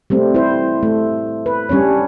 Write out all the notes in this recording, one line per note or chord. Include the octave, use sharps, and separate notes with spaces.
G3 A3 C4
E4 C5
A3
B4
G3 C#4 D4 C#5